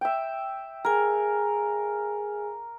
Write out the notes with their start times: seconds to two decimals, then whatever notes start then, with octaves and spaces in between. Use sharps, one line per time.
0.01 E5 G5
0.85 G#4 A#4 G#5